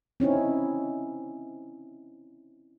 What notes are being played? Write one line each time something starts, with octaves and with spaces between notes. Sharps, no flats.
C4 C#4 D#4 E4